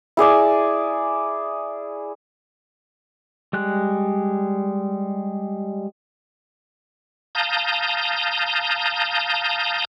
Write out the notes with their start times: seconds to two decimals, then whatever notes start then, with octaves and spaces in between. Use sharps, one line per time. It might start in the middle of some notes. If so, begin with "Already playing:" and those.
0.17 E4 G#4 D5 G#5
3.53 G3 G#3 F#6
7.35 F5 A5 A#5 D#6 G6